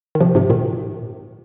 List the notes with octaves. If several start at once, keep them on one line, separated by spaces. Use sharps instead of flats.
D#3
C3 F3
G#2 C3
A#2 D#3